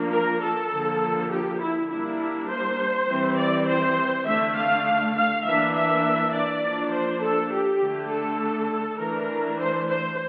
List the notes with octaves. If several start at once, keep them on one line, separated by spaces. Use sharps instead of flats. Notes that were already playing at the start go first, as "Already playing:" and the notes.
Already playing: F3 A#3 D4
A#4
A4
D3 F3 A#3
G4
E4
G3 A#3 D4 E4
C5
E3 G3 C4
D5
C5
D3 A3 D4 E5
F5
F5
E3 A#3 D4 E5
E5
D5
F3 A#3 D4
C5
A4
G4
D3 A3 D4
A4
E3 A3 D4 A#4
C5
C5